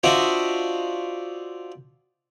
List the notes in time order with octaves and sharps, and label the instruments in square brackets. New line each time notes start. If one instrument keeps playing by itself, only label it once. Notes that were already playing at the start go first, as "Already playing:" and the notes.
[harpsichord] D4 F4 F#4 C5 D#5 E5